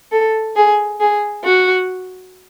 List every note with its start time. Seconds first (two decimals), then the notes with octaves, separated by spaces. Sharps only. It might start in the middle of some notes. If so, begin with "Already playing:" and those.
0.12 A4
0.56 G#4
1.00 G#4
1.44 F#4